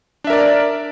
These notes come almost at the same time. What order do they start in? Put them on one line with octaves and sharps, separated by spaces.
D4 E5 A#4 D5